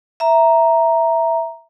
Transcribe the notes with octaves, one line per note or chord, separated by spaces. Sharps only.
E5 A#5